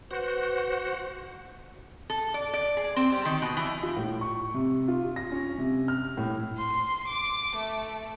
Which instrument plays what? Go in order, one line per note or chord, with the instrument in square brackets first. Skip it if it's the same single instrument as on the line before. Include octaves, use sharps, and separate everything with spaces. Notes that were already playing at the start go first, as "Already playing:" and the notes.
[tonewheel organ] F#4 C5 F#5 [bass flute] B4
[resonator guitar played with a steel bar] A4
D5
D5
G#4
C4
G3
D#3
B2
E3
[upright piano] F4
A2
C#6
C3
F4
A#6
C#4
C3
F6
A2
[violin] C6
D6
A3